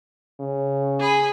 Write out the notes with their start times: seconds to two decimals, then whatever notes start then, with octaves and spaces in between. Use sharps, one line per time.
0.40 C#3
0.99 G#4 B5